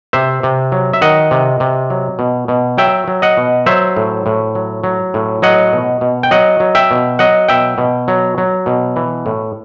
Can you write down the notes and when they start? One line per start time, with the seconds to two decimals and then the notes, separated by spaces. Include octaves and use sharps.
0.13 C3 C5 E5
0.43 C3
0.72 F#3
0.93 E5
1.01 D#3 D#5 F#5
1.31 C3
1.60 C3
1.90 F#3
2.19 B2
2.48 B2
2.78 F#3 E5 G5
3.08 F#3
3.22 D#5 F#5
3.37 B2
3.66 F#3 C5 E5
3.96 A2
4.26 A2
4.55 F#3
4.84 F#3
5.14 A2
5.42 F#3 D#5 F#5
5.73 B2
6.01 B2
6.23 G5
6.31 F#3 D#5 F#5
6.60 F#3
6.75 E5 G5
6.91 B2
7.19 F#3 D#5 F#5
7.48 B2 E5 G5
7.78 B2
8.08 F#3
8.38 F#3
8.66 B2
8.96 E3
9.26 A2